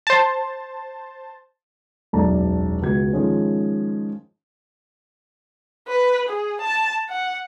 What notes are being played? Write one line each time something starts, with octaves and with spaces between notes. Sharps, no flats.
C5 A5
E1 B1 F#2 D5 A5 A#5
C#2 B2 G#6
G#2 D#3 F3 G#3 C#4
B4
G#4
A5
F#5